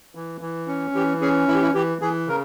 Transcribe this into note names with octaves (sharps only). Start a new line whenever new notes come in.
E3
E3
C#4
E3 G4
C#4 G#4
E3 E4
G4
E4
E3 G4
E3 G#4
C#3 A#4